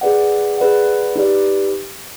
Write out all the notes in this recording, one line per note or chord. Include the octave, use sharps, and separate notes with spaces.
G#4 B4 D5 F#5
G#4 B4 D5 F#5
D#4 G4 B4 D5